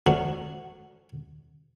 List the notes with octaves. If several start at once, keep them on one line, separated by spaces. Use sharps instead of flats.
F3 A3 C#4 D4 F#4